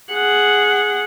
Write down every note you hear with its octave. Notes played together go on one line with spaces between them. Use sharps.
G#4 F#5